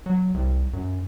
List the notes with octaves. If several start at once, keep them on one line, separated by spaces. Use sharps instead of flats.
F#3
C2
F#2